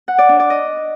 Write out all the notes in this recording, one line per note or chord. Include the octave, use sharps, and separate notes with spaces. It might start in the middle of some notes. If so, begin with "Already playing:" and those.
F#5
D5
D4
D5
D#5